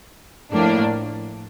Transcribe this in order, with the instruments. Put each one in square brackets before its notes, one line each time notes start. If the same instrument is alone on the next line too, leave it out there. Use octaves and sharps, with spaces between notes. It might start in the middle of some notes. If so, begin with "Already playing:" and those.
[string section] A2 F3 A#3 D4